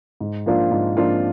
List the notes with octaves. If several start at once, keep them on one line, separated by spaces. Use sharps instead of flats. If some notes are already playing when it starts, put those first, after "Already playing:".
G#2
F3 A#3 D4 F4
G#2
F3 A#3 D4 F4